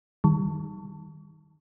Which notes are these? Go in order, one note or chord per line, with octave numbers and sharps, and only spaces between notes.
D#3 G3